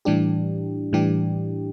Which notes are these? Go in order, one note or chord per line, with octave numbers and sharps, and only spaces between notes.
A2 E3 G3 D4 G4
A2 E3 G3 D4 G4